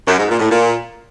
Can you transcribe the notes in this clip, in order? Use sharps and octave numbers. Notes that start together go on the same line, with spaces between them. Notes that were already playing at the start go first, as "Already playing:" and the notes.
F#2
G#2
A#2
A2
A#2